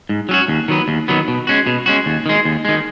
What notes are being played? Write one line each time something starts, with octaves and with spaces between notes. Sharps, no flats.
G#2
F#3 C#4 F#4
D#2
D#3 F#3 B3
D#2
D#3 F#3 B3
B2
G#3 C#4 F#4
B2
G#3 C#4 F#4
D#2
D#3 G#3
D#2
D#3 G#3